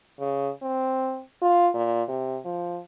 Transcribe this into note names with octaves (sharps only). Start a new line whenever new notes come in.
C#3
C4
F4
A#2
C3
F3